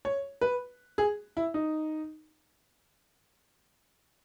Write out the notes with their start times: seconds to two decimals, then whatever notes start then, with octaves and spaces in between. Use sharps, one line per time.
0.05 C#5
0.41 B4
0.98 G#4
1.37 E4
1.54 D#4